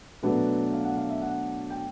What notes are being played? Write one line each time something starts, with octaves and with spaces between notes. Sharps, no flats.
B2 F#3 A3 D4 B4
F5
F#5
F5
E5
F#5
G5